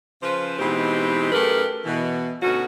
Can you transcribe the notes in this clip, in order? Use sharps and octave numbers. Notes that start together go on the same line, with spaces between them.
C#3 F3 B4 C5
B2 E3 G#3 C4 D#4 G4
F#2 A3 G4 G#4 A#4 B4
B2 E3
D2 B2 C#4 D#4 F#4